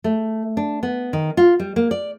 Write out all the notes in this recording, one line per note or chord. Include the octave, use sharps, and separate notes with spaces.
A3
D4
B3
D#3
F4
G3
A#3
D5